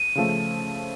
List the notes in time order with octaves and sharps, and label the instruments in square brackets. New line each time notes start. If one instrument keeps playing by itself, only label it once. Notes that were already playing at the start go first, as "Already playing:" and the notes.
Already playing: [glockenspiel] D#7
[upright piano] C#3 F3 A3